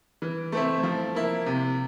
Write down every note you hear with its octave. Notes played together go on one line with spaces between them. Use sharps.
E3
A3 C4 E4
F3
A#3 E4
C3